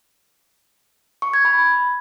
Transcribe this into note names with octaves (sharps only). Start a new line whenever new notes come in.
C#6
G#6
B5